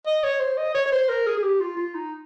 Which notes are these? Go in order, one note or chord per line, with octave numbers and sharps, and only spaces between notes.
D#5
C#5
C5
D#5
C#5
C#5
C5
A#4
G#4
G#4
G4
F4
F4
D#4